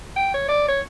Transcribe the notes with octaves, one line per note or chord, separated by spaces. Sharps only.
G5
C#5
D5
C#5